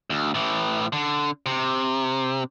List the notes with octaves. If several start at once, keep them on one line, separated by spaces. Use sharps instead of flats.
D2
A2 E3
D3
C3